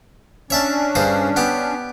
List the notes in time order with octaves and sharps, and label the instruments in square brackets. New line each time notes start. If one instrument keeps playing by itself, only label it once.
[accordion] C#4 D4 [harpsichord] C#5 E5 A5
[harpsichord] G2 G#4 C5
B3 G4